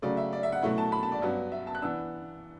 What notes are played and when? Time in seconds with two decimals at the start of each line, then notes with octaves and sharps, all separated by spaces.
0.02 C#3 F#3 A3 D5
0.17 E5
0.33 D5
0.43 E5
0.52 F#5
0.62 B2 F#3 A3 E4 F#5
0.78 A5
0.92 B5
1.03 A5
1.12 D5
1.22 G2 F#3 B3
1.52 E5
1.67 A5
1.75 F#6
1.82 E3 B3 D4 E6